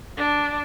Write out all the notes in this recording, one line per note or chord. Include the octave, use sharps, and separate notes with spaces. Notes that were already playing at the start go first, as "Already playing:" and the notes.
D4